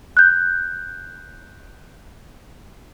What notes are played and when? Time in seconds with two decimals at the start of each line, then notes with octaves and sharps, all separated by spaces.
0.17 F#6 G6